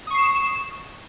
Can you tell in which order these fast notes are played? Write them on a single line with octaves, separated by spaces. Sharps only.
D#6 C#6 C7 E7